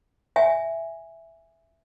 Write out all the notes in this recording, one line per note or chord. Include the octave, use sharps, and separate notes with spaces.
E5 G#5